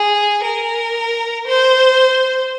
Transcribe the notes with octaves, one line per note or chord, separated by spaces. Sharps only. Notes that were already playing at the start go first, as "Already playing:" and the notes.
Already playing: G#4
A#4
C5